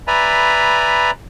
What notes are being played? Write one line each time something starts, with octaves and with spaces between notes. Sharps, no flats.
B4 D5 E5 G#5 A#5 B5